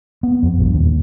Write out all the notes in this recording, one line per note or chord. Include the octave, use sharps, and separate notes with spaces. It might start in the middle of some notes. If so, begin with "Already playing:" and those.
B3
F2
A#1 G2
D#2